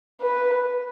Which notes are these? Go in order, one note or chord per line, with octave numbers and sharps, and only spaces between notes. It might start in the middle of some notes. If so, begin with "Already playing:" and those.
B4